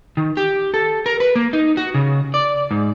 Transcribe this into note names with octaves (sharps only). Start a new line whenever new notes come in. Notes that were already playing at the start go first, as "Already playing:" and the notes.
D#3
G4
A4
A#4
B4
A#3
D#4
F#4
C#3
D5
G#2